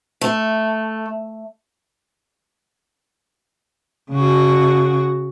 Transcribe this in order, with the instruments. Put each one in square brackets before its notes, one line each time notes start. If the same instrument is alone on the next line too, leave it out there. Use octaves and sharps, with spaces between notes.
[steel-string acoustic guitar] A3
[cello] C#3 F#4